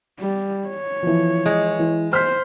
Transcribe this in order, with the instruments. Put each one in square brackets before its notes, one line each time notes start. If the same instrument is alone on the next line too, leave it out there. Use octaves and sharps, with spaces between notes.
[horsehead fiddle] G3
C#5
[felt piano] E3 F3
[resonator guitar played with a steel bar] G#3
[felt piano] E3
[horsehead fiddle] C5 [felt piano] F6 B6